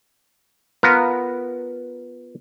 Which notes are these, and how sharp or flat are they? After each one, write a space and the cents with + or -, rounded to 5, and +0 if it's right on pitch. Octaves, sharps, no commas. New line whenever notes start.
B3 +0 F4 +0 A#4 -5